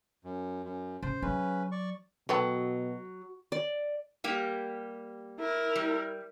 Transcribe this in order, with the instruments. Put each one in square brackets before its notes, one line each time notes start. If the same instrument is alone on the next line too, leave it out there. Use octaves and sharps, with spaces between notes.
[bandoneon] F#2
F#2
[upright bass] C#3 [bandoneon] C5
[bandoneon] C#3 C#4 B4 [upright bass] F#3
[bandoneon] D5 C#6
[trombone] B2 [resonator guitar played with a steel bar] F#3 [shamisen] A3 B3 G5
[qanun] D5
[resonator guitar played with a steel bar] G3 A#3 G4
[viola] E4 A#4
[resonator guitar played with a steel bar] G3